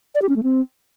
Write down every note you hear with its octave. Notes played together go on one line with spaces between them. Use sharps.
D5
G4
C#4
A3
C4